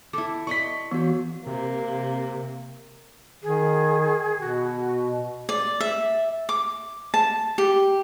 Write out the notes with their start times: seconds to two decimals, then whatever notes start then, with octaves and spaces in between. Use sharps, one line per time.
0.13 E4 A4 D6
0.47 D5 D#5 C6 C#6 B6
0.91 E3 B3 F#4
1.47 C3 A#3
3.42 D#3 G#4
4.40 B2 F#4
5.49 D5
5.80 E5
6.49 D6
7.14 A5
7.58 G4